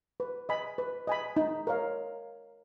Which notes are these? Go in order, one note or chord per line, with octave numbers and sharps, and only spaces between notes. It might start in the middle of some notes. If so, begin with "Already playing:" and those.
B4
D#5 G#5 B5
B4
D#5 G#5 B5
D#4
A#4 C#5 F5